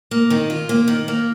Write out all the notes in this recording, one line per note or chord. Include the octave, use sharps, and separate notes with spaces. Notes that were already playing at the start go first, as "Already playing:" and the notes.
A#3
D#3
F4
A#3
D#3
A#3